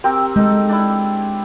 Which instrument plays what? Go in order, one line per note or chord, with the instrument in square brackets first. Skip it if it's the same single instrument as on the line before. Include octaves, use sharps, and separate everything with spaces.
[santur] C4 G4 A#4
[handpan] G#3 [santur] D#4 A4
[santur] D4 E4